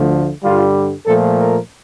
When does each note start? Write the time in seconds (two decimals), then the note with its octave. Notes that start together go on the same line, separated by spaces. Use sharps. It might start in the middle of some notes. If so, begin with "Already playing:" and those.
Already playing: D2 D3 F3 A3
0.42 G2 D3 G3 F4
1.06 A#2 F3 A3 A4
1.38 A#4